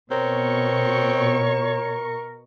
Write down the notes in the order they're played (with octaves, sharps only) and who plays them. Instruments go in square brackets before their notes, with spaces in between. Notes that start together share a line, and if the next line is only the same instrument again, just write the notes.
[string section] B2 C#6 [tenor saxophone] C4 [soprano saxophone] A#4 [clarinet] C#5